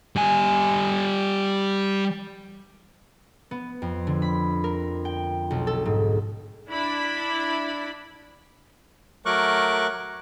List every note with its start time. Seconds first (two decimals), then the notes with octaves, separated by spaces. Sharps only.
0.16 G3 G#5
3.51 B3
3.82 F2
4.07 D3
4.22 B5
4.64 A#4
5.05 G5
5.50 B1
5.67 A4
5.85 G#2
6.71 D4 E4 D5 B5
9.26 F#3 A3 A#4 C#6 D6 F#6